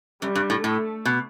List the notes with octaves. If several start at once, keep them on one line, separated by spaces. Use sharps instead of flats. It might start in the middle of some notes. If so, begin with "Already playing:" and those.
F#2 G3
G2
A2
A2 A3
B2